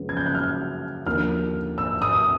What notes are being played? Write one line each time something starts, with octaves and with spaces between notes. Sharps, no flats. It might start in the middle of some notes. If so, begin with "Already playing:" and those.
Already playing: F#2 C#3 F3 G#3 B3
G#6
G6
F#6
F6
D#2 D3 F3 A#3 F6
E6
D#6